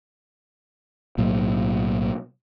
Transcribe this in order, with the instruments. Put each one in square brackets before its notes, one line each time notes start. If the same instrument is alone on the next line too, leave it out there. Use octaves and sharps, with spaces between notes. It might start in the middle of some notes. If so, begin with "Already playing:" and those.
[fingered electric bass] B1 A2 F#3 A#3